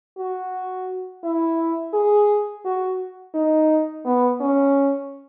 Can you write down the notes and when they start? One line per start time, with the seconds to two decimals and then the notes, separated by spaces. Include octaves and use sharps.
0.18 F#4
1.24 E4
1.94 G#4
2.65 F#4
3.34 D#4
4.05 B3
4.41 C#4